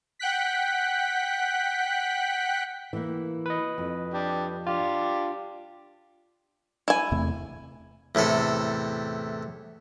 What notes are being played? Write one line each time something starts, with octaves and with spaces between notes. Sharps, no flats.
F#5 G5 F#6 B6
E3 A#3
B4 D#5
F2
D4 G4
D4 F4 G4
E4 G#5
E2 C3 A3
E2 A2 C3 A4